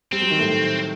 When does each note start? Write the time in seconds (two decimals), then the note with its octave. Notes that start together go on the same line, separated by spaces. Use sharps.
0.12 G3 C4
0.22 F#3
0.31 D#3
0.39 A2